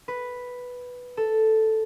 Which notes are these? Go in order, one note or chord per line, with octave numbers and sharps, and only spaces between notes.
B4
A4